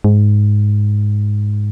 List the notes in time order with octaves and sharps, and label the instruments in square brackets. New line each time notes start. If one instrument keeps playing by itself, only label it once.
[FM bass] G#2